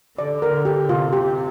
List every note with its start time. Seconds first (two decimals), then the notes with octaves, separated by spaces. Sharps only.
0.18 D3 D5
0.42 A#4
0.65 G4
0.89 C3 F4
1.13 G4